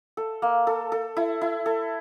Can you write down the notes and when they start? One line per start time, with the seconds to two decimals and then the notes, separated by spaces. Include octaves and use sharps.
0.17 A4
0.42 A#3
0.67 A4
0.92 A4
1.17 E4
1.41 E4
1.66 A4